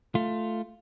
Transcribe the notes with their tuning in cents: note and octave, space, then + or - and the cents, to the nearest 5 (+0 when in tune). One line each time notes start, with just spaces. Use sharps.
A3 +0 F4 +0